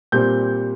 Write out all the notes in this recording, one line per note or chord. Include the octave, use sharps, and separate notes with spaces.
A#2 G3 C4 G6